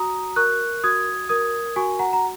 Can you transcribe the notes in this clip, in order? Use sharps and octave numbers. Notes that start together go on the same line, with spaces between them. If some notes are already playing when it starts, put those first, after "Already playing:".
Already playing: F#4 A#5 D#6
A#4 C#6 F#6
F#4 D#6 G#6
A#4 D#6 G#6
F#4 G#5 C#6
F#5 A#5
A#5